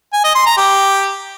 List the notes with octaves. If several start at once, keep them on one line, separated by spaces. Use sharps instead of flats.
G#5
D#5
C6
A#5
G4